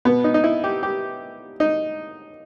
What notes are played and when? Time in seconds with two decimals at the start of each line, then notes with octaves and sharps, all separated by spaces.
0.05 B2 B3
0.24 D#4
0.34 D#4
0.44 E4
0.64 G4
0.83 G4
1.60 D#4